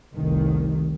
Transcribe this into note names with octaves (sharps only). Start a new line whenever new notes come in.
F1 C2 D#3